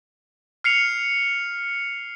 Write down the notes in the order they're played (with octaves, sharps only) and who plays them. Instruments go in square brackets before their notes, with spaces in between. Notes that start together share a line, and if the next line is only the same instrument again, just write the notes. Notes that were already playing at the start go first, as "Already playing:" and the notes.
[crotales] F6 C7 C#7 F7